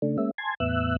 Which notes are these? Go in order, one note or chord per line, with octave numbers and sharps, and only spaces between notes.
C#3 A3 D4
G#3 A#3 C#4 E5
G#5 A5 C6 G#6
E2 A2 B3 E5 E6 F#6